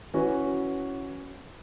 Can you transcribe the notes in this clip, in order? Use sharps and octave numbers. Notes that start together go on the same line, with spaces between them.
E3 C#4 F#4 B4